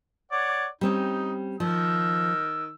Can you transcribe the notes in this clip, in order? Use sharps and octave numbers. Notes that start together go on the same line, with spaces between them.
C#5 D5 F#5
G3 C4 C#4 D#4
D#3 F3 E6